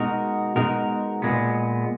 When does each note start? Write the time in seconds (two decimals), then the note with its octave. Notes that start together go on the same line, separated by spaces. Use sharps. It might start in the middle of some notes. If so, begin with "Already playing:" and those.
Already playing: B2 G#3 D#4 F#4 A#4
0.56 B2 G#3 D#4 F#4 A#4
1.22 A#2 G#3 B3